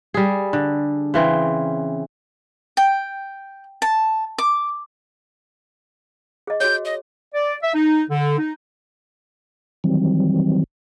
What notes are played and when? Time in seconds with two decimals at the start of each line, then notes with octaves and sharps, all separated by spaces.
0.14 G3 G#4
0.53 D3
1.14 C#3 E3 C4
2.77 G5
3.82 A5
4.38 D6
6.47 G#4 D#5
6.60 F#4 G#4 C#5 G6
6.85 D#5
7.34 D5
7.63 E5
7.75 D#4
8.11 D3
8.38 D#4
9.84 D#3 E3 F#3 G3 C4